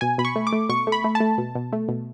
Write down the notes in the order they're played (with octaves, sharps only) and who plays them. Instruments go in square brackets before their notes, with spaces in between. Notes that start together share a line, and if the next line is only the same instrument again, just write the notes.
[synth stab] B2 G#5
B2 B5
C#6
A3
D6
A3
B2 C#6
A3
B5
A3
A5
A3
B2
B2
A3
B2